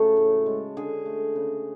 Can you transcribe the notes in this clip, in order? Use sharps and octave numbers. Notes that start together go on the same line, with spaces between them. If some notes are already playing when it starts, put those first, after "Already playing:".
Already playing: C#3 F#3 A3 A4
A2
G#3
D3 G#4
A3
C#3